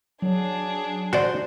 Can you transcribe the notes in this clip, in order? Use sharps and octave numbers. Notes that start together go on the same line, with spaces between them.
F#3 D4 G#4
F#4 C5 D5